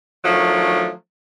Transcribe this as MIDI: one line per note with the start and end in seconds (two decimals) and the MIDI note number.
0.24 0.91 51
0.24 0.91 53
0.24 0.91 54
0.24 0.91 57
0.24 0.91 62